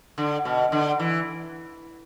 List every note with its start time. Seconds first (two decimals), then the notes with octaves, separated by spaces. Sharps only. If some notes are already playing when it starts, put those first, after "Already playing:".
0.18 D3
0.45 B2
0.72 D3
1.00 E3